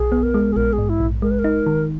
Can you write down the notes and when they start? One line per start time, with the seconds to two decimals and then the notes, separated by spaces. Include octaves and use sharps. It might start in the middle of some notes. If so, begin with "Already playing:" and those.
Already playing: B1 G#4
0.12 B3
0.23 A#4
0.34 G#3
0.52 G#4
0.56 A#1 A#4
0.73 G#4
0.78 G#2
0.89 E4
1.00 A#1
1.22 G#3 A#4
1.31 B4
1.39 A#4
1.44 D#4
1.66 D#3